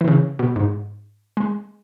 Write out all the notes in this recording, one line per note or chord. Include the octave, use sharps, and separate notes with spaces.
E3
C#3
B2
G#2
G#3